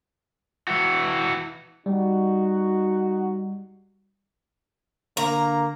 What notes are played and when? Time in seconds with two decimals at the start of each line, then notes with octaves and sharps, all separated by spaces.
0.68 E3 F#4
1.86 G3 D#4 F#4
5.17 D3 A#3 A#5